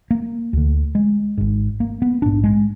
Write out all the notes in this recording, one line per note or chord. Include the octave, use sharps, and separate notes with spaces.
A#3
D2 D3
G#3
G#1 G#2
A#3
B3
A#1 G#2 D4
G#3